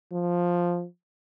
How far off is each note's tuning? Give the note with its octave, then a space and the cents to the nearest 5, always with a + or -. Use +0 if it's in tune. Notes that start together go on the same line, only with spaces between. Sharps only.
F3 +5